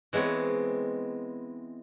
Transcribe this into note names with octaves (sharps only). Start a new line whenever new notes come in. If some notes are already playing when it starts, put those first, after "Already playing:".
E3 G#3 B3 C4 C#5